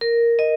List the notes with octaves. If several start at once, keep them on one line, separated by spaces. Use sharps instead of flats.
A#4
D#5